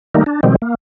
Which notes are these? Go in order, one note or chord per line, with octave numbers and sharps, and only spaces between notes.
D#3 G3 A3 A#3 D#4
D4
B2 D#3 F3 G3 G#3 C4
A#3